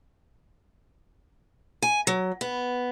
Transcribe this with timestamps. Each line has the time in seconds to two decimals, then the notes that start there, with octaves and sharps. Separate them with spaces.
1.82 G#5
2.07 F#3
2.41 B3